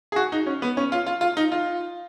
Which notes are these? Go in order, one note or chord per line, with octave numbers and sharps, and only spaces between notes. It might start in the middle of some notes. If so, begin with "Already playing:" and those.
G#4
F#4
D#4
C#4
B3
C#4
F4
F4
F4
D#4
F4